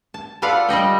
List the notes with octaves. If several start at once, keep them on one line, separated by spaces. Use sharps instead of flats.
A5
F4 A4 B4 D5 F5 F#5
G3 D5 D#5 G5